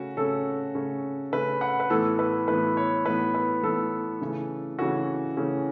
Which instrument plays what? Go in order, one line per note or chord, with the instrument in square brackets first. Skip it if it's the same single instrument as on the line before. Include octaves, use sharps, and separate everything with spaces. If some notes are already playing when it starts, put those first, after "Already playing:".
Already playing: [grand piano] C#3 A3 C#4 F#4
C#3 A3 C#4 A4
C#3 A3 C#4
C#3 A3 C#4 B4
F#5
B4
A2 E3 B3 A4
B4
A2 E3 B3 B4
C#5
A2 E3 B3 B4
B4
A2 E3 B3 A4
C#3 E3 A3 C#4
C#3 E3 A3 C#4 F#4
C#3 E3 A3 C#4